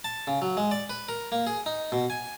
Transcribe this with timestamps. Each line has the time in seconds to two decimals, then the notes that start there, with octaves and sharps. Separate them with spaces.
0.04 A5
0.27 C#3
0.42 F#3
0.57 G#3
0.71 D5
0.90 B4
1.09 A#4
1.32 A#3
1.47 G#4
1.66 D#4
1.92 B2
2.10 G#5